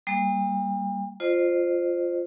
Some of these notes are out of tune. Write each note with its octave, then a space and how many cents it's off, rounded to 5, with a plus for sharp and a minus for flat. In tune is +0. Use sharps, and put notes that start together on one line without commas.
G3 +0 A#3 +0 G5 +45
F4 +0 C5 +0 D#5 -35